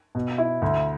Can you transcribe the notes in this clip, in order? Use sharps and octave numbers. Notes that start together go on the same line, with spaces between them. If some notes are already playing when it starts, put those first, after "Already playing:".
B2
E4
D2